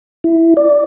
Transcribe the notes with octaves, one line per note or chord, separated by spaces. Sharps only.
E4
D5